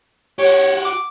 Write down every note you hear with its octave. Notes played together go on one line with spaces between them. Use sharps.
F#4 G4 C#5
D6